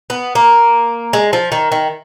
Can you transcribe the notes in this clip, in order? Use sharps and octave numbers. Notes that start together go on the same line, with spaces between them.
B3
A#3
G#3
F3
D#3
D#3